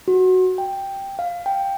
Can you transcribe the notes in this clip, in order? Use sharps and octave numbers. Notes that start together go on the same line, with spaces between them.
F#4
G5
F5
G5